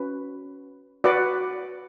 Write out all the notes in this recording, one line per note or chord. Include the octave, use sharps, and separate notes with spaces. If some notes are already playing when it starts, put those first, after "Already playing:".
Already playing: C#4 F#4 B4
F#4 B4 D5 F#5